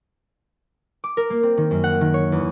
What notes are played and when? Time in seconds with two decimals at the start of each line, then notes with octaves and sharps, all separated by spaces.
1.04 D6
1.17 A#4
1.30 A#3
1.43 C4
1.57 D#3
1.71 F#2
1.84 F#5
2.01 D#3
2.14 C#5
2.32 E2